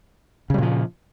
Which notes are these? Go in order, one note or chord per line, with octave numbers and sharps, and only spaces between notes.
A#2 C#3 F3 G3